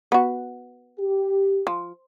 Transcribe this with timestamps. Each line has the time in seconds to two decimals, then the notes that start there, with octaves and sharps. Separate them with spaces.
0.12 B3 F#4
0.99 G4
1.67 F3